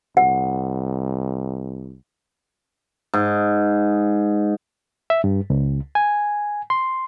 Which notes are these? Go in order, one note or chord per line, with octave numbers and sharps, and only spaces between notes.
C2 F#5
G#2
E5
G2
C#2
G#5
C6